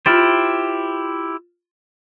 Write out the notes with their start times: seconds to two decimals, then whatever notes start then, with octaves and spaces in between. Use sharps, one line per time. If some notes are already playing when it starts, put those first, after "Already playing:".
0.06 E4 F4 G4 C5 F6 A6